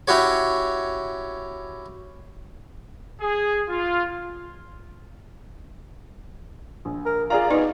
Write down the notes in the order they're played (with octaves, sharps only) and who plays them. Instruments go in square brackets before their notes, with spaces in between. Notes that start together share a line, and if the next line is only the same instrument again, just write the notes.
[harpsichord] C#4 E4 F#4 G4 C#5
[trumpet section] G#4
F4
[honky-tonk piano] A#1
[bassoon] A#4
[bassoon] F4 [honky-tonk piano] G#4 D5 A#5
[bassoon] B2 [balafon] D#4